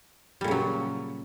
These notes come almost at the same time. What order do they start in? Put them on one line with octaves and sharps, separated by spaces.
G3 A#2 C#3 F#3